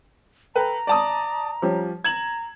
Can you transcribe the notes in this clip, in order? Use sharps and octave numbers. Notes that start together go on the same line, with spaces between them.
A4 B4 G5 A#5
D5 A5 D#6
F3 G3 C#4
A#5 G#6 E7 F#7